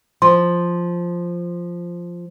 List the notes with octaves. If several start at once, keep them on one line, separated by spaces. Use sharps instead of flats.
F3 C6